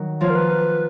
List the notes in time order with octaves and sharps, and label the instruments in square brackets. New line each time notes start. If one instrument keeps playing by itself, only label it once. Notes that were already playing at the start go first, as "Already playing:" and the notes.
Already playing: [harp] D#3 F#3 D#4
[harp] F3 A#3 F4 [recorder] C#5
[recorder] A#4
B4